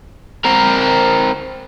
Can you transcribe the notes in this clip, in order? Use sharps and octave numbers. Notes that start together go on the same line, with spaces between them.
C4 A#4